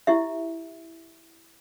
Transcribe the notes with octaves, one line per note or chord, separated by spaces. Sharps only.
E4 G4 E5